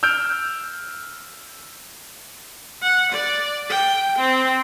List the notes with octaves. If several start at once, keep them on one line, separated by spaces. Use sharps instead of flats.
E6 F6 G6 D7
F#5
D5
G5
C4